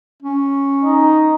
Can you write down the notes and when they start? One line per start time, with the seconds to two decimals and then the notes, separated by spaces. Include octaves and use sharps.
0.23 C#4
0.84 D#4